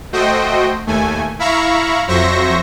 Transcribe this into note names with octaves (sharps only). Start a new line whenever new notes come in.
A3 F#4 C5 D#5 G5
D#2 A3 G#5
E4 E5 F5 A#5 B5 C#6
F2 F#3 C5 E5 C#6 A#6